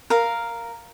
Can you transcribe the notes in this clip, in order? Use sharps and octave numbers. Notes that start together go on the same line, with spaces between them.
A#4 F5